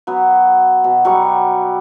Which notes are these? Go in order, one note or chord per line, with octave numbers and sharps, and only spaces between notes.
F#3 B3
B2
F#3 G3 C#6